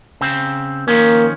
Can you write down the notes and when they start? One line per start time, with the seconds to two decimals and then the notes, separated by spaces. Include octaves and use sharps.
0.21 C#3 C4
0.88 D#3 F3 A#3 C#4